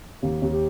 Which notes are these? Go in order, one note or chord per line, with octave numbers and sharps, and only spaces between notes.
D#2 G4
D#2
G4